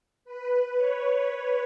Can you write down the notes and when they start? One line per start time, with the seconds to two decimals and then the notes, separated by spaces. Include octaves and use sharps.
0.25 B4
0.77 C#5